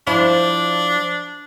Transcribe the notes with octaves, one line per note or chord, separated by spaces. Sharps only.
F3 D4 E4